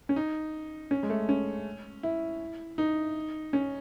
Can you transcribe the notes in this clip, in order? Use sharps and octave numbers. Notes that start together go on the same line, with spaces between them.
C#4
D#4
C#4
G#3
A3
C#4
E4
D#4
C#4